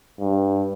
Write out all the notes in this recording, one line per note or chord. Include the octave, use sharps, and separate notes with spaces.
G2